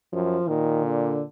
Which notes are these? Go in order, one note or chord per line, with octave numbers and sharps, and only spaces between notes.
F#2 F3
A#2 D#3
D3